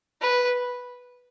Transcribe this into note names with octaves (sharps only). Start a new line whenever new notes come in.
B4